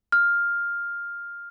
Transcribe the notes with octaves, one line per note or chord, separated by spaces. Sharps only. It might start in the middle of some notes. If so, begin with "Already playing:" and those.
F6